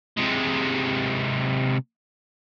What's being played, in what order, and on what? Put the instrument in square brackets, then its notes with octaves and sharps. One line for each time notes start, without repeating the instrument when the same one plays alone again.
[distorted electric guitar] C3 G#3